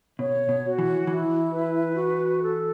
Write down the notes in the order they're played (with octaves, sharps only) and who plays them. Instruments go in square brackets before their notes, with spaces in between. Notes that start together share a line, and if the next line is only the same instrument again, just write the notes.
[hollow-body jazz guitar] B2 [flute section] C#5
[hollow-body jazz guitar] B2
[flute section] F#4
[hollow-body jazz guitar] E3
[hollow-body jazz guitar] E3 [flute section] E4
[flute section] B4
F#4
A4